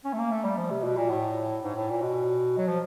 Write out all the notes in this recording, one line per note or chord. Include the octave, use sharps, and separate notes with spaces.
C#4
A3
A#3
A3
G3
F3
C3
B2
A#2
A2
G#2
A2
A#2
B2
F#3
F3